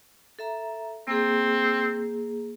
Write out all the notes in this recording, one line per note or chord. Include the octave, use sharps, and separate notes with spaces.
A4 E5 A#5
A#3 C4 G#4